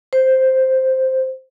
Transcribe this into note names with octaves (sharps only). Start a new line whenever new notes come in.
C5